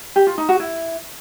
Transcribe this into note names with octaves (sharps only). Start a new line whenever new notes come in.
G4
F4
D#4
F#4
E4